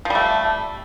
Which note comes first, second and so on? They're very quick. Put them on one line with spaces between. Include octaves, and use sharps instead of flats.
F3 G3 A3